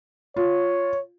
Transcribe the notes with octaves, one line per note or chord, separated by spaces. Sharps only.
F4 C#5